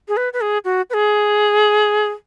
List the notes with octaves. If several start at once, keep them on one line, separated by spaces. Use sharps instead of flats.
G#4
B4
B4
G#4
F#4
B4
G#4